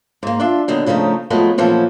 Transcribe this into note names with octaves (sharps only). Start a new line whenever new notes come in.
G#2 A#3
D4 F4 E5 A5
B2 D3 D#3 F#3
A2 C#3 F3 A3 D#4
F3 F#3 G#3 A3 B3
A#2 E3 F3 B3 C#4 A4